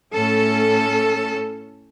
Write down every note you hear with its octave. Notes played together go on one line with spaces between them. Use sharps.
A2 C#4 A4